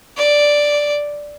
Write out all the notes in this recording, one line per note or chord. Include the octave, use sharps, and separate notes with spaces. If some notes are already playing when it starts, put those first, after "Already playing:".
D5